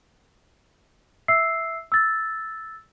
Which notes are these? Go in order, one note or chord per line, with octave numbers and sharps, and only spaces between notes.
E5 E6 C7
E6 A6